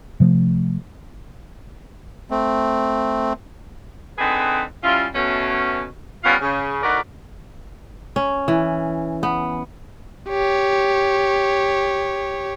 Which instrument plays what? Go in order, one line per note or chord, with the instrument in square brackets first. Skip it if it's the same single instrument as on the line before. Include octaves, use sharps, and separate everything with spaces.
[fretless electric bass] C3 F3 A3
[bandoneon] A3 C4
[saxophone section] D3 C4 D#4 G#4 B4
G3 C#4 E4 F4
B2 A3 C#4
G3 B3 C#4 F4 A#4 F5
C#3
D2 D#4 F#4 A#4 B4 D5
[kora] C#4
E3
B3
[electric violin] G4 C#5